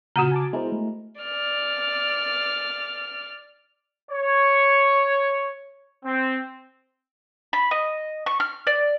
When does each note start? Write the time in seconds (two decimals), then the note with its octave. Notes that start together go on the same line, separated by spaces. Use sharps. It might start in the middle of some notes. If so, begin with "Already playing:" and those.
0.16 A#2 C#3 F#4 F#5 A#5 F6
0.31 G#5 A5 D6
0.53 G#3 B3 E4 A#4 C5
0.72 A3
1.22 D5 F6
4.12 C#5
6.05 C4
7.53 B5
7.71 D#5
8.26 C#6
8.40 F6
8.67 D5